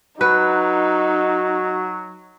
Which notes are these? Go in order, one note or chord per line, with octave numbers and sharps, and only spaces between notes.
F#3 D#4 F#4 B4